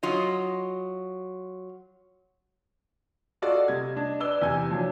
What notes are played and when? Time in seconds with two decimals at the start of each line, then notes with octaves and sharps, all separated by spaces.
0.03 F#3 F4 D#5
3.42 F4 F#4 A4 D5 D#5
3.68 C3 G3 D#5 G#6
3.95 D4 D#5
4.20 B4 D5 E6 G7
4.42 E2 C3 G#5 G#6
4.71 F3 F#3 D4